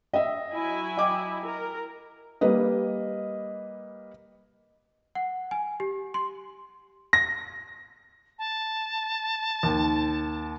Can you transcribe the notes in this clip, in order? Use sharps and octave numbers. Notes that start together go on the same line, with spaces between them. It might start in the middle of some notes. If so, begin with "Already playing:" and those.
D#5 E5
F#3 E4 G#5
D#5 G5 D6
A#4
G3 A#3 B4 D#5
F#5
G#5
G4
C6
A#6
A5
D#2